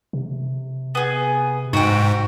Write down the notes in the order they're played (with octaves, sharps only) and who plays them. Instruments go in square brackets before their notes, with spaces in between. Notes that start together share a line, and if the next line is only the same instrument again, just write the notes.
[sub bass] C3
[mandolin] B3 G#4
[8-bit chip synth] G#2 [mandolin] F#4 G5